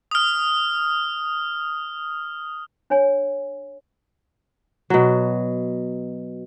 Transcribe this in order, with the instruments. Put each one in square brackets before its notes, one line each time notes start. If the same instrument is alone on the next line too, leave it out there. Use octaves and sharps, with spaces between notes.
[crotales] D#6 F6
[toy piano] D4 C#5 G#5
[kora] B2 F#3